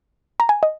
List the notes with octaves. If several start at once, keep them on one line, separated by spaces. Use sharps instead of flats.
A#5
G#5
D#5